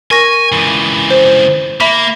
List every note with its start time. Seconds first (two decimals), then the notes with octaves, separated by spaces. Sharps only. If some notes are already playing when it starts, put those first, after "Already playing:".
0.11 A#4 G#5 C#6 A#6
0.52 C#2 E3
1.10 C5
1.80 A#3 E5 B5 B6